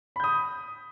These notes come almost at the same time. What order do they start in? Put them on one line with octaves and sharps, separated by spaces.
B5 G6 D#6